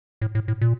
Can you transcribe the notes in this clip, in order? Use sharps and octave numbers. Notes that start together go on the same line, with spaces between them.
A2
A2
A2
A#2